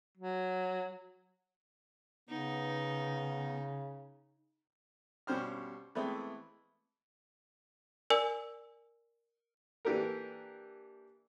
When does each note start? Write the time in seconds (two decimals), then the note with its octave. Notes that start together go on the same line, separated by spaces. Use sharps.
0.17 F#3
2.29 C#3 B3 D#4
5.27 G2 B2 C#4 G4 C5 F6
5.95 E3 G#3 A3 B3 C4
8.10 A#4 D5 G#5 E6
9.85 E3 A#3 D4 G4 A4 A#4